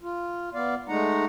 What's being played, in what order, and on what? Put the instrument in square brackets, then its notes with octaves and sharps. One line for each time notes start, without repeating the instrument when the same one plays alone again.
[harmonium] F4
B3 D5 F5
G#3 A3 D#4 F#5 A#5